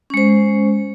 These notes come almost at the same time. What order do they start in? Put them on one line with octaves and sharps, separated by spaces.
C#4 G#3 C5